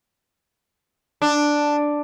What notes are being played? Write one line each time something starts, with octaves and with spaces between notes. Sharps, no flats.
D4